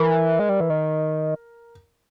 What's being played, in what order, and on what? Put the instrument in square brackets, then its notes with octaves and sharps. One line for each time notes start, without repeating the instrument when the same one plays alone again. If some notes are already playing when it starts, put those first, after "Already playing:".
Already playing: [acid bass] E3 [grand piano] A#4
[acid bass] G#3
G3
E3
D#3